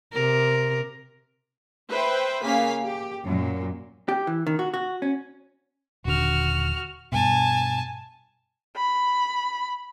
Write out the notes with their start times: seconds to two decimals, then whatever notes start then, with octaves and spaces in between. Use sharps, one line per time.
0.14 C3 A#4
1.91 B4 C5 E5 G5
2.42 C#3 A#3 F5 G#5 B6
2.83 G4
3.24 F#2 A#2
4.09 G4
4.27 E3
4.47 D#3
4.59 F#4
4.74 F#4
5.02 C#4
6.05 D#1 D3 F#4 F6
7.12 G2 B2 G#5 A5
8.76 B5